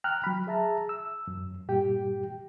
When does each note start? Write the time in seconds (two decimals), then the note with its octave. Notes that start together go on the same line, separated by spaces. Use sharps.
0.04 G5 A#5 F6 F#6
0.24 F#3 B5
0.47 G#4 E5 A5 A#5
0.89 E6
1.27 F#2
1.68 G2 A#2 G3 G4 G5